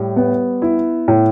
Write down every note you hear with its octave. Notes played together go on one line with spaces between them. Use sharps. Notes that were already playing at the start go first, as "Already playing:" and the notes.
Already playing: A2 G3
B3
E4
A2